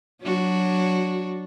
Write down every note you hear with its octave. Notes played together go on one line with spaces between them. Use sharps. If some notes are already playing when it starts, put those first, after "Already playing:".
F#3 D4 F#4